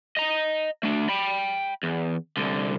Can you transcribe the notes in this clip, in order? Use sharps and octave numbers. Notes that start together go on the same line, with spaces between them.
D#5 A#5
A3 D4
G5 B5
E2
C2 D3